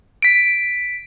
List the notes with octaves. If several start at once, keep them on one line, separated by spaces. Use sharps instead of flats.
B6 D7